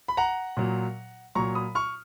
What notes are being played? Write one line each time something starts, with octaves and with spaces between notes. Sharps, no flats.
B5
F#5 A#5
A#2 F#3
A#2 F#3 A#5 C#6
B5 D#6
C#6 F6